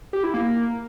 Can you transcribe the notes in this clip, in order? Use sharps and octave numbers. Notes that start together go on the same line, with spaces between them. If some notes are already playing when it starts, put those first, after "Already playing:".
G4
E4
A#3